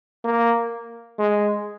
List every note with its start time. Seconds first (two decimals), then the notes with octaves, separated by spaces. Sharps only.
0.24 A#3
1.19 G#3